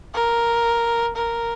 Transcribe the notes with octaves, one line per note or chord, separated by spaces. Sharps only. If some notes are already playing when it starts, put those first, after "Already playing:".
A#4
A#4